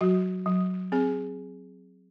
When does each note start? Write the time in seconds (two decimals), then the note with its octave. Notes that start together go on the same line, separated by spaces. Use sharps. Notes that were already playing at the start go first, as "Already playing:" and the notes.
0.01 F#3 F#4
0.46 F#3
0.92 C4 G#4